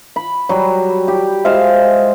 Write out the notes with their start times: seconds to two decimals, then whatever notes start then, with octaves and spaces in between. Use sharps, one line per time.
0.16 B5
0.49 F#3 G3
1.08 G4
1.45 G#3 C5 E5 F5